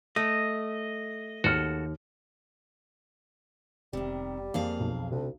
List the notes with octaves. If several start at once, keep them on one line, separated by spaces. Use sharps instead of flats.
A3 D#5
D#2 F#4 A4 F6
F1 C3 D#3 G3
F2 A#3 G#4 F5
B1
D2 C3